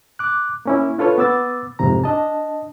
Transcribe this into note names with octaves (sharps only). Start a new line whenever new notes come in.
D6 F#6
A#3 C#4 E4
D4 F4 A4 B4 C#5
B3 D6 E6 A6
C2 F2 G#2 C3 A#5
D4 D#5 A5